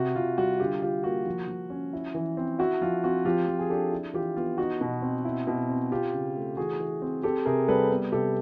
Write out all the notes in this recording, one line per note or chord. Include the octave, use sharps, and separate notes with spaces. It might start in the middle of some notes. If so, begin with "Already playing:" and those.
Already playing: C3 F#4
C3 F4
G3 F#4
D3 F4 G4
D3 F4 G4
A#3 F#4
F3
F3
C#4
E4
E3
C4
E4 F#4
F3 F4
C4 F#4
F3 F4 G4
F3
G#4
D4 G4 A4
E4
E3 F4 G4
B3 F4
D#4 F#4
B2
C4
E4
B2
C4
C4 F4 G4
C#3
A3
E3 F#4 G#4
E3
C4
C4 G4 A4
C3 G#4 A#4
G3 A4 B4
B3
C3 G4 A4